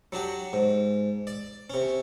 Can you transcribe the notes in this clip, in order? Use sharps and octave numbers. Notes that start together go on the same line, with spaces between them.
F#3 D4 F#4 G4
G#2
D5
C3 C#4